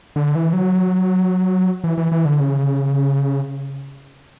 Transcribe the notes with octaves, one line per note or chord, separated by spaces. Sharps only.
D3
E3
F#3
E3
E3
E3
D3
C#3